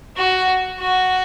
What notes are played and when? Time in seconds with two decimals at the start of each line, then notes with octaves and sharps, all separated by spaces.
0.17 F#4
0.80 F#4